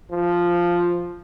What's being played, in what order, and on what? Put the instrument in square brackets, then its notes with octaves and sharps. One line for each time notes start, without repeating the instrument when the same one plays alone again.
[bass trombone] F3